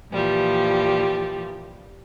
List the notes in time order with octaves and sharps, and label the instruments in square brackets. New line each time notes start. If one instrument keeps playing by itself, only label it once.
[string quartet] A#2 E3 F3 G3 G4